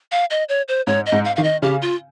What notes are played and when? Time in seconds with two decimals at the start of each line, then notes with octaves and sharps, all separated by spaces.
0.12 F5
0.30 D#5
0.49 C#5
0.68 C5
0.87 G#2 C#5
1.06 D#5
1.12 G#2
1.25 F5
1.36 D#3 F5
1.44 D#5
1.62 C#3 G4
1.82 F4